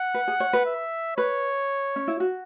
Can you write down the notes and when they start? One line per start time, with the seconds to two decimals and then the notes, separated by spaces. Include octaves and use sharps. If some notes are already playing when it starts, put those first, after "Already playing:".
Already playing: F#5
0.14 B4
0.28 G#4
0.40 C#5
0.53 B4
0.66 E5
1.17 B4 C#5
1.96 C#4
2.08 E4
2.20 F#4